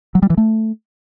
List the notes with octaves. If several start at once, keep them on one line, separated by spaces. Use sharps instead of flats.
F#3
G3
E3
A3